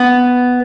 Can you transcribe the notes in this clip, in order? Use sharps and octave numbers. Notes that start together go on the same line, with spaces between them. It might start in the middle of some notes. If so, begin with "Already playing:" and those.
Already playing: B3